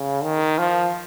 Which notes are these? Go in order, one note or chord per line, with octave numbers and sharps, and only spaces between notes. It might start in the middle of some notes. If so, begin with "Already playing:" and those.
Already playing: C#3
D#3
F3